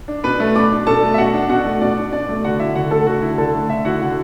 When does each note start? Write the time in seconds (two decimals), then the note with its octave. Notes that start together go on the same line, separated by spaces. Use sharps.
0.08 D4
0.24 B2 B4 B5
0.40 A3
0.55 B2 D5 D6
0.71 D4
0.87 B2 A4 A5
1.03 A3
1.14 E5
1.18 B2 F#4 F#5
1.34 D4
1.49 B2 F#4 F#5
1.65 A3
1.81 B2 D5
1.97 D4
2.13 B2 D5
2.29 A3
2.44 D3 F#4 F#5
2.60 E4 E5
2.75 D3 F#4 F#5
2.91 A3 A4 A5
3.06 D3 F#4 F#5
3.22 E4
3.38 D3 A4 A5
3.54 A3
3.69 D3 E5
3.85 E4 F#4 F#5
4.01 D3 F#4 F#5